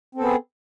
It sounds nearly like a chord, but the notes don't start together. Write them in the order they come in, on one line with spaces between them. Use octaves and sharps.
C4 A4 B3 G#4